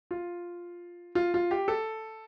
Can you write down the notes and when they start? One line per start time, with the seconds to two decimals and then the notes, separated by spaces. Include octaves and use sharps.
0.11 F4
1.15 F4
1.34 F4
1.51 G4
1.68 A4